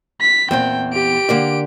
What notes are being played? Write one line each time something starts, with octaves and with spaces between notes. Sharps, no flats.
B6
E2 A#2 C4 G5
G4 D7
D3 A#3 D5